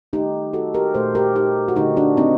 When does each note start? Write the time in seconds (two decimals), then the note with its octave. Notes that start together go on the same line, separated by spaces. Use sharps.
0.13 D#3 A3 D#4 G4
0.53 F#4 A4
0.74 G4 A#4
0.94 A#2 A3 A4 C5
1.15 G4 A#4
1.35 D#4 G4
1.68 F#4
1.76 D3 A3 D#4 G4
1.96 D4 F#4
2.17 C4 D#4